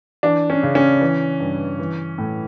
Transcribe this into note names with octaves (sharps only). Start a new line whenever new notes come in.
E3 D4
C#4
C#3
C#4
E3
G2
E3
A2